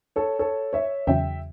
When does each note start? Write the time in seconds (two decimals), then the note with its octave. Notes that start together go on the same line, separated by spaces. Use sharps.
0.16 A4 C#5
0.39 A4 C#5
0.73 C#5 E5
1.07 E2 C#3 F#3 C#4 E5 G5